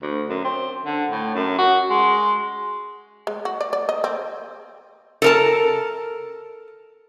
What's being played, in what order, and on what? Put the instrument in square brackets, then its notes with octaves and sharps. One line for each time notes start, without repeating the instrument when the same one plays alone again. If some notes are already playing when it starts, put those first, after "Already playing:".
[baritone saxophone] D2
F#2
C4
D3
A2
F#2
F#4
G#3
[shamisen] G#3
F#4
D5
D5
D#5
C4
[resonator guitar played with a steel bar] A4 A#4 A5